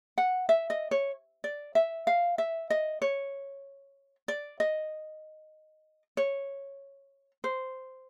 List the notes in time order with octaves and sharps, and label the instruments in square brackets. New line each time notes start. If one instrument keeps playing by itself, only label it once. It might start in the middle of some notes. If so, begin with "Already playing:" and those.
[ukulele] F#5
E5
D#5
C#5
D5
E5
F5
E5
D#5
C#5
D5
D#5
C#5
C5